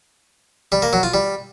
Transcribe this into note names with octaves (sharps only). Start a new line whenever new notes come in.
G3
A#3
F#3
F4
G3